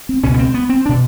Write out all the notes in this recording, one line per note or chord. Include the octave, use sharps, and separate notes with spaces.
C4
C#2 B2 C#4
B3
C4
B3
C4
D4
B2